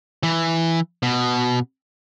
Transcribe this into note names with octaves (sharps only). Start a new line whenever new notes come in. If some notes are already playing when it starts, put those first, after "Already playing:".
E3
B2